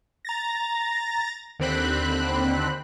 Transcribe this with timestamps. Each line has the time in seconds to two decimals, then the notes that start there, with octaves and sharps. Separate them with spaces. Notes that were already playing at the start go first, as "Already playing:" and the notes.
0.25 A#5 A6 A#6
1.59 D#2 D3 C4 B5 F#6